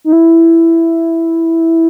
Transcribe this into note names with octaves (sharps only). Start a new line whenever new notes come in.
D#4
E4